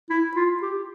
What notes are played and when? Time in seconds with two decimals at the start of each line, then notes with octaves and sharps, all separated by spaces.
0.10 E4
0.36 F4
0.62 G4